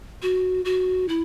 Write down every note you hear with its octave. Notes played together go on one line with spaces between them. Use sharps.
F#4
F#4
E4